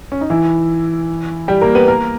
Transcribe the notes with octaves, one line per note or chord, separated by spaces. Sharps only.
C#4
D#4
E3 E4
G3 G4
A#3 A#4
B3 B4
A#3 A#4